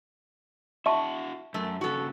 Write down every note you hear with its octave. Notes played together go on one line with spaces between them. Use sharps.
E4 F#4 E5 A5 C#6
F#2 A3
G2 C#3 F#4 A4